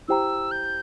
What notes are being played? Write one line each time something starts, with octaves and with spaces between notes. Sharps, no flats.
E4 G4 C5 G5 A#5 E6
G6